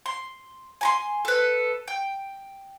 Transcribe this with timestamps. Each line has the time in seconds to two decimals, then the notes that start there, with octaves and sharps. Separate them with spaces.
0.06 C6
0.81 G#5 A#5 C6
1.25 A4 B4
1.88 G5